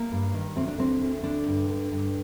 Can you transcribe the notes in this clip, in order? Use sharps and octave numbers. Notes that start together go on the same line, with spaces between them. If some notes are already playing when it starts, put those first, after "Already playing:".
Already playing: A#3
G2
D#3
D2 C4
D4
D3 C4
D2
D3 D4
G2
D3
G2